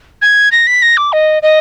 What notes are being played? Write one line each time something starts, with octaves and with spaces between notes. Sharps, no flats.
G#6
A#6
B6
A#6
D6
D#5
D#5